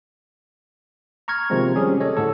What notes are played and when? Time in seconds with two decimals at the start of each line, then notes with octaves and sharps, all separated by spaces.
1.28 A#5 C#6 F6 G#6
1.50 C3 D#3 F3 G#3 A#3 C4
1.75 G3 C4 C#4 G4 G#4
2.00 A4 C#5 D#5
2.16 A2 D3 D4 A4